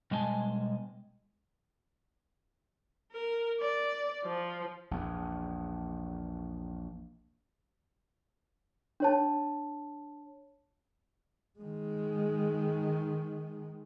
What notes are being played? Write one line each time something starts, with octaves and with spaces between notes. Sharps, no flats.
B2 G3 G#3 D#5 G#5 A5
A#4
D5
F3
A#1 E2
D4 C#5 A5
D#3 G#3